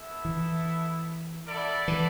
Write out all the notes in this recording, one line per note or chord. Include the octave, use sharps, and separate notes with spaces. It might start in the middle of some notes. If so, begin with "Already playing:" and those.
Already playing: B3 E4 A4 E5
E3
E4 A4 D5 F#5
E3